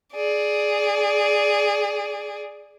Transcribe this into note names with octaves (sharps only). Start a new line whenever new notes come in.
G#4 D5